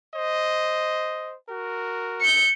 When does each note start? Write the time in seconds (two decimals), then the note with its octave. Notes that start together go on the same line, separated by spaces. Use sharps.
0.14 C5 D#5
1.49 F#4 A#4
2.21 G6 C#7